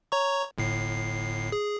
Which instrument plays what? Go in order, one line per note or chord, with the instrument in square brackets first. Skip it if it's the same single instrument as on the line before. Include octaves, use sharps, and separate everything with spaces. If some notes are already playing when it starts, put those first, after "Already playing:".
[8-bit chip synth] C#5 A#5 C#6
[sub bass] D1 [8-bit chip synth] G1 A2 C7
[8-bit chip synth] G#4